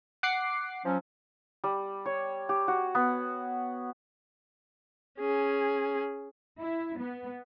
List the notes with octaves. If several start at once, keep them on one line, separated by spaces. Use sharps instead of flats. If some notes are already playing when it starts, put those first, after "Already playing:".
F#5 D6 C7
F3 F#3 C#4
G3
C#5
G4
F#4
B3
C#4 G#4
E4
B3